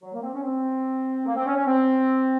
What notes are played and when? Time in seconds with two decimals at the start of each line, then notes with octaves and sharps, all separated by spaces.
0.03 F#3
0.14 A#3
0.23 C4
0.34 C#4
0.44 C4
1.26 A#3
1.36 C4
1.46 C#4
1.56 C#4
1.66 C4